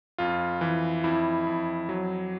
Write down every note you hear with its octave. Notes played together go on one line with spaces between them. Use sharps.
F2 F4
E3
F2 E4
F2
F#3